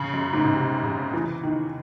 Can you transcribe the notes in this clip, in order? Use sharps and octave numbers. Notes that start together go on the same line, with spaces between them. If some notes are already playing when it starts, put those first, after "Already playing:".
Already playing: C#3
F#2
G#2
C#3
C3
C#3
E3
D#3